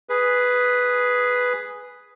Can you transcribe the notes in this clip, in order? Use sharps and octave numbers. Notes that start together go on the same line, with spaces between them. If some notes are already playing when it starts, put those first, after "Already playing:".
G#4 B4